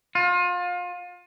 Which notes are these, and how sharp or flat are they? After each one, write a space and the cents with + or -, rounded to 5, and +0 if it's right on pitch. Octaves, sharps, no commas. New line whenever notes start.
F4 +30